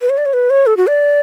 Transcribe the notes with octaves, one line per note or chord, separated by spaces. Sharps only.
B4
C#5
D5
C#5
B4
C#5
A4
F#4
D5